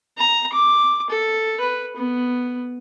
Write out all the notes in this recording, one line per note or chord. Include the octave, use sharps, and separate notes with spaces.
A#5
D6
A4
B4
B3